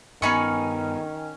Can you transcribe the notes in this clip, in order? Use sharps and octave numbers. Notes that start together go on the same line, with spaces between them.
G2 D#3 B3 C#4 D#4 G#5 B5 C#6